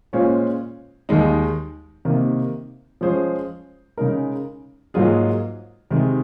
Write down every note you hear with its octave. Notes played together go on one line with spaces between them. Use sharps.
A#2 G#3 C#4 F4 C5
D#2 D#3 G#3 D#4
C3 D#3 A#3
F3 G#3 C#4 G#4 C5
C#3 G#3 D#4 A#4
G#2 F#3 A#3 F4 G#4
C3 D#3 G#3